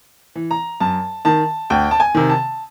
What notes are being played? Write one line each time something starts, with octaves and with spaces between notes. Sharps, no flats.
E3
A#5
F#2 A5
D#3 A5
D2 G5
A5
G#5
C3 D#3
A5